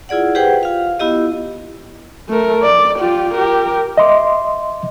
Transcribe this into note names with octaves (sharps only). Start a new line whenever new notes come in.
E4 F4 G#4 D5 F#5
G4 G#4 B4 C5 F#5 G5
F4 F5
B3 E4 G4 D#5
A3 A#4
D5
F4 G4
G4 A#4
D#5 E5 C6 D6